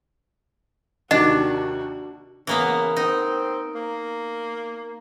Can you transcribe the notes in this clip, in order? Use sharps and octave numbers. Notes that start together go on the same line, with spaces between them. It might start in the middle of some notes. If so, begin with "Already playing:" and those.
D#2 C3 D#3 D4 F#4 D#5
C#3 E3 A#3 B3
C4 D#4
A#3